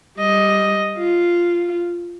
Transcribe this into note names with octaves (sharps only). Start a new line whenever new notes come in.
G3 D#5
F4